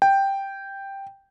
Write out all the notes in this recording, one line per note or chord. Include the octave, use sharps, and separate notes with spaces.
G5